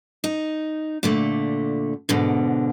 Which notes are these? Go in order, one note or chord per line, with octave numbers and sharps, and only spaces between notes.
D#4
A#2 D3 A3
G#2 B2 D3